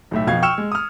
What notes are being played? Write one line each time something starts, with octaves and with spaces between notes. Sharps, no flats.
B1 A2 E5
F2 B2 F5 G#6
G5 C#6 E6 F6 C#7 E7
G#3
D#6 F6